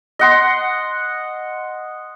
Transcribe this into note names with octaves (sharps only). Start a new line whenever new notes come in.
D#5 F#5 C6